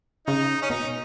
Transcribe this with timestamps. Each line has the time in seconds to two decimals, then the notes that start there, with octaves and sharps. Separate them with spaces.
0.27 C#3 D#4
0.62 C#4
0.70 B2 D#4